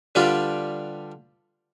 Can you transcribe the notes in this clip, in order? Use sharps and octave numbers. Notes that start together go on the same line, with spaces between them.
D3 G3 D4 F4 G4 B4